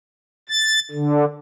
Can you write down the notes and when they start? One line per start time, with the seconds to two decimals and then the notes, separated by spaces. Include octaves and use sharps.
0.49 A6
0.91 D3